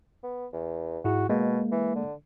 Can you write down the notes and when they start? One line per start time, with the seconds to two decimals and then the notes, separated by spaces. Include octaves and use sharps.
0.23 B3
0.53 E2
1.05 G#2 E4 F#4 G#4
1.29 B2 G#3 A#3
1.72 E3
1.95 D3